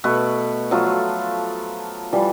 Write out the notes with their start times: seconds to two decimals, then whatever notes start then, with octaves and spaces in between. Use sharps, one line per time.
0.04 B2 A3 B4 C#6
0.71 F3 F#3 A3 F4
2.13 E3 F3 G3